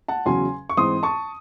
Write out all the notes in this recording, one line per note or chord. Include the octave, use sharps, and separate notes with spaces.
F#5 A5
E2 C#3 F#3 C#4 G#5 C6
C#6
G#2 E3 C4 C6 D#6
A5 C#6